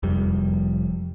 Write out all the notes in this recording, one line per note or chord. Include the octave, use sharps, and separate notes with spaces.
F1 F2 G3